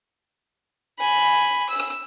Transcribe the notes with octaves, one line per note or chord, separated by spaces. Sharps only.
G#5 B5
E6